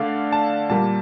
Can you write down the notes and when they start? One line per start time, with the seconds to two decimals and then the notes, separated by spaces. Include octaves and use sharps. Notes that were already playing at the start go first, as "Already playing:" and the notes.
Already playing: D3 A3 D5 F5
0.33 A5
0.70 A#2 G3 A#3 A5